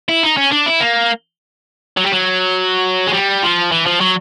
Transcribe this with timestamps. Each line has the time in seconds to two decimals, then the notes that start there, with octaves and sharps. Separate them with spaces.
0.09 E4
0.23 D#4
0.37 C#4
0.51 D4
0.66 E4
0.80 A#3
1.97 F#3
2.04 G3
2.12 F#3
3.07 G#3
3.13 G3
3.43 F3
3.72 E3
3.86 F3
4.00 F#3